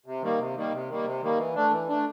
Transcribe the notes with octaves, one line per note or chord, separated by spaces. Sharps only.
C3
D#3 G3 A#3
C3
D#3 G3 A#3
C3
D#3 G3 A#3
C3
D#3 G3 A#3
E3
A3 D4
E3
A3 D4